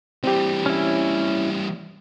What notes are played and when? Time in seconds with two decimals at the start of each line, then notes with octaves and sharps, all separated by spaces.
0.24 E3 G3 C4 G4
0.66 C#4 E4